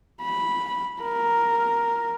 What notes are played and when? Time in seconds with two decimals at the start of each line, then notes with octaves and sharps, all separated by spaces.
0.22 B5
1.02 A#4